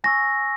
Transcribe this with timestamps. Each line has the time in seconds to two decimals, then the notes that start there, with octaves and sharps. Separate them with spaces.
0.04 G#5 C#6 E6 A#6